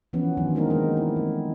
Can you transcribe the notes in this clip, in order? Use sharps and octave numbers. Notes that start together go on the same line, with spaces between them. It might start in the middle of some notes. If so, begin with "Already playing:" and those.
E3 F3 B3 C#4
D#3 F#3 D4 F4
G#3 A#3 C4 D4 D#4 A#4
G#3 B3 A#4
E4
A3